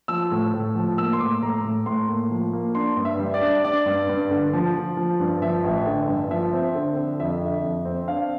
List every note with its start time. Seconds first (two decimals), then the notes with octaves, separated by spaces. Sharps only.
0.08 F3 E6
0.31 A2
0.54 A2
0.75 F3
0.97 A#3 E6
1.13 C6
1.20 A2 D6
1.42 A2 A#5
1.64 A2
1.86 A2 C6
2.08 A#3
2.31 F3
2.53 A#3
2.75 D4 C6
2.97 G2
3.05 E5
3.19 G3
3.34 D5
3.41 D4
3.64 D4 D5
3.86 G2
4.09 G2
4.31 D3
4.53 F3
4.74 F3
4.97 F3
5.20 G2
5.42 F3 E5
5.64 A1
5.86 D3
6.08 G2
6.31 F3 E5
6.53 C4
6.75 D3
6.97 D3
7.20 F2 E5
7.41 D3
7.64 F2
7.85 C4
8.08 D4 F5